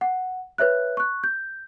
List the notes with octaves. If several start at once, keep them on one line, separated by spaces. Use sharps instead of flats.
F#5
B4 C#5 E5 F#6
C#6 F#6
G6